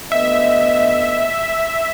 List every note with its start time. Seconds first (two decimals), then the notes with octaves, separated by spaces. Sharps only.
0.12 D2 B3 D#5 E5